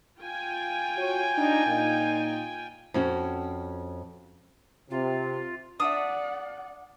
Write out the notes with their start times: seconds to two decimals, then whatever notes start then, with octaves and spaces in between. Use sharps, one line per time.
0.19 F4 G5 G#5
0.97 F#4 C#5
1.37 D4 D#4
1.66 A#2 D#4
2.94 F2 C#4 F#4
4.90 C3 F4
5.80 D4 D5 E5 F#5 D#6